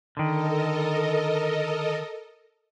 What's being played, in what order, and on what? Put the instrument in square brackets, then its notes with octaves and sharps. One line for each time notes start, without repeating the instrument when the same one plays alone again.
[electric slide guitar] D3 D#3 [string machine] A4 A#4 D#5